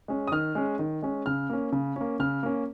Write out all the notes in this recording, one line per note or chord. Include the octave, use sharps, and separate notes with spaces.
G#3 C#4
D#6
D#3 F6
G#3 C#4
D#3
G#3 C#4
C#3 F6
A#3 C#4
C#3
A#3 C#4
C#3 F6
A#3 C#4